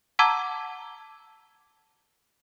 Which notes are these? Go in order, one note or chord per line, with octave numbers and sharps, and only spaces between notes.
F#5 A5 A#5 D6 E6 G#6